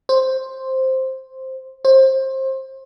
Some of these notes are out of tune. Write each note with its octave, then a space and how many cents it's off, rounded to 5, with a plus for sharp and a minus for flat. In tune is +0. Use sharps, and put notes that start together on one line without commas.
C5 +5
C5 +25